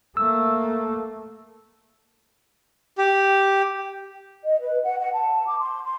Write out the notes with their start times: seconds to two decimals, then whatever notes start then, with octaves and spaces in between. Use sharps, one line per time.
0.17 A3 A#3 E6
2.98 G4
4.43 D#5
4.60 B4
4.85 F#5
4.98 F#5
5.13 A5
5.47 D6
5.59 C6
5.84 C6